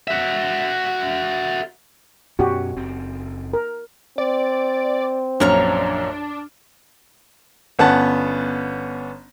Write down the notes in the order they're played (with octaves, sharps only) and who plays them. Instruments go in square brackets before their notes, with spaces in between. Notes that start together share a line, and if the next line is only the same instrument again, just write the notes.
[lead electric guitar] F#4 E5
[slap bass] F#2 B2 C#4 [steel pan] F#4 G4
[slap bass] F#1 F#2 C4
[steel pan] A#4
[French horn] C4 [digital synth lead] D5
[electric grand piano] A#1 F#2 F6 [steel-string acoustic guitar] A#3 C#5 A#5 [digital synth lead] D4
[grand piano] G1 B3 C#4 F#5 A5